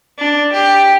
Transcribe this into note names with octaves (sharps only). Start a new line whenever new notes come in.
D4
G4